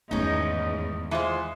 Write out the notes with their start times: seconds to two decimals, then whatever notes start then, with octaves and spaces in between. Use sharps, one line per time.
0.11 E2 G#2 D#3 A3 C#4 D#4 D#5
1.11 E3 G#3 F4 C5